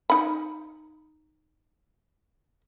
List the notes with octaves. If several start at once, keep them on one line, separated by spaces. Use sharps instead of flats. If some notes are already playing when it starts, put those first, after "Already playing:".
D#4 B5